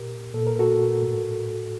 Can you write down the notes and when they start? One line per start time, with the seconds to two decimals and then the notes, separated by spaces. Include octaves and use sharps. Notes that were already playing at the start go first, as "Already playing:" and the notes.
Already playing: A#2 G4 A#4
0.34 A#2 A4
0.47 A#4
0.59 F#4 A4
1.02 A2